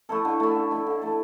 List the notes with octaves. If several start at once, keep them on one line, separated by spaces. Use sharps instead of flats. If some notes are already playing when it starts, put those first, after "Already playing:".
A3 E4 A4
D3
A3 E4
D3
A3 E4
D3
A3 E4 A4